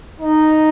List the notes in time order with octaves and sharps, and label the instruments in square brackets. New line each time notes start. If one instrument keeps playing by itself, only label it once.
[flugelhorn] D#4